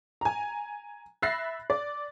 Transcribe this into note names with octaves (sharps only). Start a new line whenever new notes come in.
G#5 A#5
E5 B5 F#6 A6 A#6 C7
D5